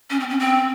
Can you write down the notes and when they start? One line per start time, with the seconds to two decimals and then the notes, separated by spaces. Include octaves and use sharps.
0.10 C#4
0.20 C4
0.30 C#4
0.40 C4